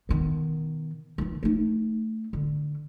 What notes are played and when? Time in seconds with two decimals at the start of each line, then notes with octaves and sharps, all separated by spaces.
0.09 B2 D#3
1.18 D#3 E3
1.43 A3 D#4
2.33 D3